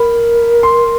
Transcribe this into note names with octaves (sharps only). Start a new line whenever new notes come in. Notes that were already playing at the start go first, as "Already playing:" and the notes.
Already playing: A#4 B5
C6